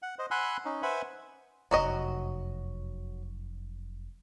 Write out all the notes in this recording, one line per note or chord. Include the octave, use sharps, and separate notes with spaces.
F#5
C5 D#5
F#5 G#5 B5 C6 E6 F#6
C#4 D#4
B4 C5 E5 F#5 G#5 B5
F1 F#2 F#3 F#4 D#5